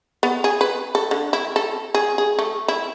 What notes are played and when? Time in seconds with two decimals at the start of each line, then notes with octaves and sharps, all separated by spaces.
0.23 B3
0.44 G#4
0.61 B4
0.95 A4
1.11 D3
1.33 E4
1.56 A4
1.94 G#4
2.18 G#4
2.39 A3
2.68 E4